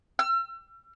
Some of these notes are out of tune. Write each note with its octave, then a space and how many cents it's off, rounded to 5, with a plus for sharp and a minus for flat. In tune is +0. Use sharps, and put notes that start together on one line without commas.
E6 +40